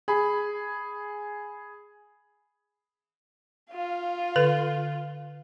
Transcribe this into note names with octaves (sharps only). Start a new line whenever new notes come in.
G#4 B5
F4 F5
D3 A4 B4